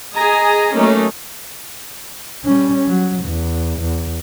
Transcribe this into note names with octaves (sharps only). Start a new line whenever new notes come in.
G#4 D#5 G#5 A#5
F#3 A3 A#3 C#4 D#4
G3 C#4
F#3
E2
E2